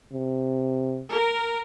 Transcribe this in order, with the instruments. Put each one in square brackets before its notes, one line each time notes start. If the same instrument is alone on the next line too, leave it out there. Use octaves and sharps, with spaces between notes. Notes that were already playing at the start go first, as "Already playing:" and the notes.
[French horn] C3
[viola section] A#4